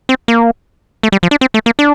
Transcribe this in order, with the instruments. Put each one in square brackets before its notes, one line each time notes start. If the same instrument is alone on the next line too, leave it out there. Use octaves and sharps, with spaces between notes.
[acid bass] C4
A#3
A3
G3
F3
D4
C4
A3
A#3
D4